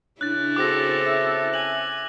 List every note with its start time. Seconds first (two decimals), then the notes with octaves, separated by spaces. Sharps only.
0.21 C#3 D4 E4 C#5 F#6 A6
0.56 C4 F#4 G#4 A4 D6 A#6
1.05 E5 E6
1.54 G#5 F#7